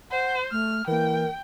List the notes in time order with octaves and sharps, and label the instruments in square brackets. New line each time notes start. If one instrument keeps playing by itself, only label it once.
[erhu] C5 [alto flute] F#5
[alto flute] A3 [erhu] F6
[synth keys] E3 A#3 [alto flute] A#4 [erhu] G5